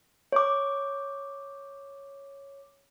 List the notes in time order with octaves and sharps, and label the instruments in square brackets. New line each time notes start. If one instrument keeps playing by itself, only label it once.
[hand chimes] C#5 D6